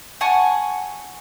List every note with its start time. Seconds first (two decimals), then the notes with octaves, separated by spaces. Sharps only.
0.21 F#5 G#5 A5 C#6